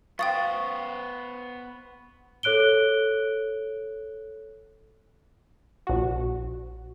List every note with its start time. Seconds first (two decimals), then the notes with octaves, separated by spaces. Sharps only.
0.19 B3 C5 F5 G5 C#6 D#6 A6
2.43 A4 C#5 F#6 D7 G7
5.87 A#1 F#4